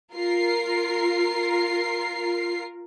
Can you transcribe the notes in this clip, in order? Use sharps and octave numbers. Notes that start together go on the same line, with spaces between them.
F4 A#4 C7